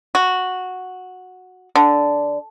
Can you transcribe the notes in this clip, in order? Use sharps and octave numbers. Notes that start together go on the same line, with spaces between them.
F#4
D3